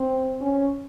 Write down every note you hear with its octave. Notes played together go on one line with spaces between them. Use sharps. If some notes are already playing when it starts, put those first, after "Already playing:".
Already playing: C4
C#4